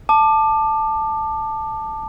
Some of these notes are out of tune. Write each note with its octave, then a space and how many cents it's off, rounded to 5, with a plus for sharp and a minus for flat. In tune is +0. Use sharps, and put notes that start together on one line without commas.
A5 +0 D6 +25